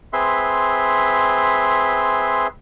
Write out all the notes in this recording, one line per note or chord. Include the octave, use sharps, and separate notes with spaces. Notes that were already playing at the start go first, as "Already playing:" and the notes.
C4 G#4 B4 E5 C6